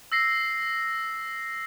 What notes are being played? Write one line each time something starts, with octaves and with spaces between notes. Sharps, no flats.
E6 A#6 C7